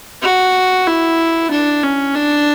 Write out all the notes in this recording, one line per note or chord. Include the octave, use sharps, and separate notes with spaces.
F#4
E4
D4
C#4
D4